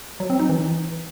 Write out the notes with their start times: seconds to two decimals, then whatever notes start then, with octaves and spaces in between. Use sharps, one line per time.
0.20 F#3
0.30 C4
0.39 D#4
0.49 E3